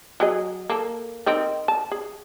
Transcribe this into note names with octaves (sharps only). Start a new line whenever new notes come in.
F#3 G#4 D#5
A#3 A4
C4 D#4 A#4
A5
G#4